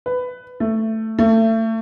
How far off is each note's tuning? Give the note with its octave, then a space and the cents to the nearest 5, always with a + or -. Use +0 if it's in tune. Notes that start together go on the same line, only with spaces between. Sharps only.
B4 +15
A3 +10
A3 +30